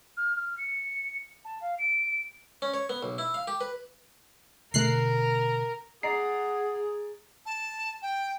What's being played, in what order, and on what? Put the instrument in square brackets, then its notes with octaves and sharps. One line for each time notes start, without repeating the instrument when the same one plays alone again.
[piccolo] F6
F6
C#7
A5
F5
D7
[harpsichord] C#4
C#5
B3
B1
E4
F5
G4
B4
[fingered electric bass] B2 D3 [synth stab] A3 F#6 C7 [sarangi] A#4
[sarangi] G#4 [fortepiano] D5 A#5 [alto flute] F#5 [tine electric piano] C7
[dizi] A5
G5